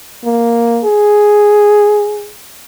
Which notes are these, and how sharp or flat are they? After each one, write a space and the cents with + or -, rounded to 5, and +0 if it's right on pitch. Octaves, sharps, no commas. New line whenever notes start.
A#3 +0
G#4 +0